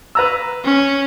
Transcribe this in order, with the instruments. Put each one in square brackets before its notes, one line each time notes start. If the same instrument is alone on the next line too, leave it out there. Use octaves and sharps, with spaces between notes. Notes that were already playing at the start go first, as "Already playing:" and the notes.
[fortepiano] B4 A#5 E6
[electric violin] C#4